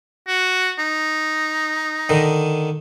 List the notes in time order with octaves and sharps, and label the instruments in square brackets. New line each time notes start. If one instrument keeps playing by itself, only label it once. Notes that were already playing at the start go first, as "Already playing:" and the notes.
[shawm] F#4
D#4
[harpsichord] D3 D#3